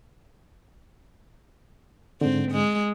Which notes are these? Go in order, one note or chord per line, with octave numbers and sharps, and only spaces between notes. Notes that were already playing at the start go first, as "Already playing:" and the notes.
G#2 D3 C4
G#3